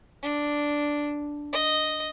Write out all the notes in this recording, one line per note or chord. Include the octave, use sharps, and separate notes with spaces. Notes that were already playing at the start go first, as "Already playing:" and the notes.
D4
D#5